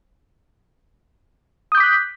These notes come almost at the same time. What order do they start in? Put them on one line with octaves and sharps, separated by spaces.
D#6 G6 D6 B6 F#6